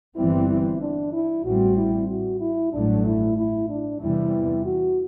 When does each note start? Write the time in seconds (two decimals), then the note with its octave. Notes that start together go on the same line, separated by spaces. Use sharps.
0.16 G1 G2 E3 G3 C4 E4
0.49 E4
0.81 D4
1.12 E4
1.44 A1 A2 G3 C4 F#4
1.76 E4
2.09 F#4
2.40 E4
2.73 A1 G2 F#3 A3 D4
3.05 E4
3.37 E4
3.69 D4
4.02 E2 C3 E3 G3 E4
4.66 F#4